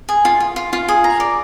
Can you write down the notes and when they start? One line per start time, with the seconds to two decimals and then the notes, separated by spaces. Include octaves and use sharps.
0.09 G#4
0.25 F4
0.40 F4
0.56 F4
0.73 F4
0.89 G#4
1.04 A#5
1.20 D5